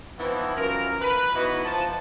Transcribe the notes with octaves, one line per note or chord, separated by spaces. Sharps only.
E3 F3 B3 C4 D#4 E4
F#2 E3 F4 A#4
B4
E3 B3 D#4 E4 F#4 D#5
F3 A5